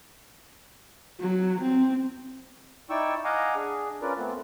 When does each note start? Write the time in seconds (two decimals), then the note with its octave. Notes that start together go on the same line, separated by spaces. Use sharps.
1.20 F#3
1.62 C4
2.90 D#4 E4 D5 G5 C#6 E6
3.25 D#5 F5 F#5 G#5 A#5 D6
3.56 D4 G#4
4.02 C#4 F4 A#4 B4 D5
4.18 A3 B3 C4